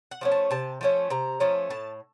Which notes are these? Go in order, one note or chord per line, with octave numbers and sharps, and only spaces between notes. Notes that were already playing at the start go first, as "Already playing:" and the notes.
F#5
F3 A3 C#4
A5
C3 A5
F3 A3 C#4
C3 A#5
F3 A3 C#4
A2 A5